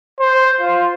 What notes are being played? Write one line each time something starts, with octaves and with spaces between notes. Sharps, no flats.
C5
F4